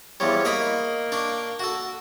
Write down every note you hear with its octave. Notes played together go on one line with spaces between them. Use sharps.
E2 F3 G3 C#5
A#3 C#5 D#5 B5
D4 C#5
F#4 A4